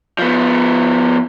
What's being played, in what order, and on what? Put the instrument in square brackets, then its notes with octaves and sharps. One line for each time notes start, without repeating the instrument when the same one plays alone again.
[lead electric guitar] F3 B3